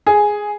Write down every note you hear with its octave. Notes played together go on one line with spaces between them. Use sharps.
G#4